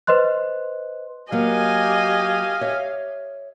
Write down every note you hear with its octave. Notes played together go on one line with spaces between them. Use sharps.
B4 C5 D#5 C6 F#6
F#3 A#3 G4 D#5 F5 G#5
C#5 E5